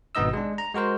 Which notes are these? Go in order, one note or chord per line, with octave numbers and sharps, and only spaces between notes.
G#1 B2 B3 D#4 D#5 E6
G#3 D4
A#5
G#3 F#4 A#4 C5